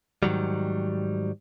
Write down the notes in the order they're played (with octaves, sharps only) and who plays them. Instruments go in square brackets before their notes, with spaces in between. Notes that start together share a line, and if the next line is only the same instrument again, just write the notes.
[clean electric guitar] G#2 D#3 F#3 G3